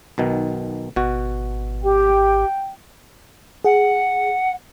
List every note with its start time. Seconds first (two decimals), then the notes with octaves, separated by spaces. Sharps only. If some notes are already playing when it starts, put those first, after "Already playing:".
0.18 B1 B2 D#3
0.96 G#1 B2 F#4
1.84 G4 G5
3.64 G#4 F#5